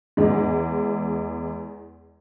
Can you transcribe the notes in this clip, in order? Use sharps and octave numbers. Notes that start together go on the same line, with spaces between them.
E2 G#3